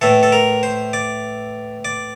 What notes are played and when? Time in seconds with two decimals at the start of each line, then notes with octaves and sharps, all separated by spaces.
0.01 A2 E3 A4
0.23 A4
0.32 A#4
0.63 C5
0.93 D5
1.85 D5